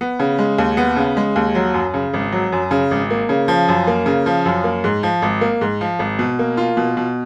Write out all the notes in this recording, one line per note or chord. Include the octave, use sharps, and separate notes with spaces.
B3
C#3
G#3
D#2
B3
C#3
G#3
D#2
F#3
F#2
C#3
G#1
F#3
F#2
C#3
G#1
A#3
C#3
F3
F#2
A#3
C#3
F3
F#2
A#3
G#2
F3
G#1
A#3
G#2
F3
G#1
B2
A#3
F4
B2
B2